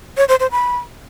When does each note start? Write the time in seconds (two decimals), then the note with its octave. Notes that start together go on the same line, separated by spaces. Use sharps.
0.17 C#5
0.29 C5
0.40 C5
0.51 B5